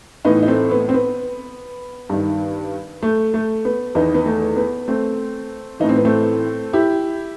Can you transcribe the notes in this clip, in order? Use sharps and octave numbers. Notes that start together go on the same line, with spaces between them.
A2 E3 B3 D#4
D#4
A3 C4
B3
C4
B3
G2 D#3
A3
A3
B3
E2 D#3 B3 D#4
B3
A3
B3
A3 C4
A2 E3 D#4
C4
B3
A3 C4
E4 G4